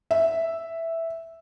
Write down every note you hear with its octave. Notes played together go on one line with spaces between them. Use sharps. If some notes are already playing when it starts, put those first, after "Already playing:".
E5